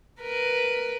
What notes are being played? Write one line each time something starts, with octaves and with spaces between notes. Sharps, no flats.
A#4 B4